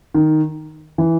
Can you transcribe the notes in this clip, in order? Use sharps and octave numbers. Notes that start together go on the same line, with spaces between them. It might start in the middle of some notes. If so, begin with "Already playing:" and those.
D#3
E3